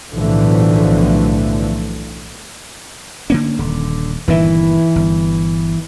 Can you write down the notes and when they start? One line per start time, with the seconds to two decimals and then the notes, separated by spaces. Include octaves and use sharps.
0.11 B1 A2 D3 E3 F3 A3
3.30 D3 A#3 C#4
3.59 D#1 D3
4.28 G1 A#2 D#3 E3 E4
4.96 G1